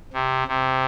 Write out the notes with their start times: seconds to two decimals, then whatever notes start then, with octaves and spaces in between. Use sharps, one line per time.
0.13 C3
0.48 C3